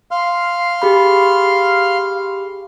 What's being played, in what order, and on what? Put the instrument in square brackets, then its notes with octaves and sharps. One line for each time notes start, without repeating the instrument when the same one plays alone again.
[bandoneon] F5 C6 F6
[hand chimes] G4 G#4 B5